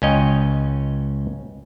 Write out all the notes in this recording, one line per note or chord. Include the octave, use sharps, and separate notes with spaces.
C#2 C#4 D#5 G5